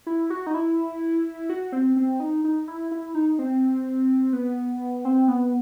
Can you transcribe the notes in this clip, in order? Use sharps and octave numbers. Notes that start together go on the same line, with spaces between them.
E4
F#4
D#4
E4
F#4
C4
C4
D#4
D#4
E4
E4
D#4
C4
B3
C4
B3